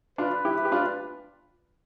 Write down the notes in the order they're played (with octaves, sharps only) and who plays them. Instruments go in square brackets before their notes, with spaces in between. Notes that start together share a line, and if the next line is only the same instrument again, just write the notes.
[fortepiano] D4 F4 [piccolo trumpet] B4
[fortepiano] E4 G4
G4
D4 F4